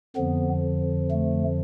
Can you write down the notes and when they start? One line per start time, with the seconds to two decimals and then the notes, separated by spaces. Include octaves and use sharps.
0.16 F2 D3 F3 B3
1.11 A3